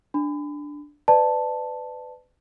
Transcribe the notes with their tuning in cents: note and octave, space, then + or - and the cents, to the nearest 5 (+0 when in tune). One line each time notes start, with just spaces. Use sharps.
D4 +0 B5 +35
B4 +30 D5 +20 A5 +0